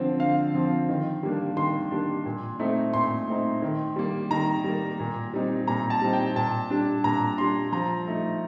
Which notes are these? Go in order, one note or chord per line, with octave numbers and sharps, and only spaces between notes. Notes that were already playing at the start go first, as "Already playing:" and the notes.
Already playing: D3 F3 C4
D3 F5
F3 C4
D#3
G3 A#3 D4
D#3 C6
G3 A#3 D4
A#2
A3 C4 D#4
A#2 C6
A3 C4 D#4
D#3
G3 A#3
D#3 A#5
G3 A#3
A#2
G3 C4 D#4
A#2 A#5
A5
G3 C4 D#4
G5
A#2 A5
G3 D4
A#2 A#5
G3 D4 C6
F3 A#5
A3 D#4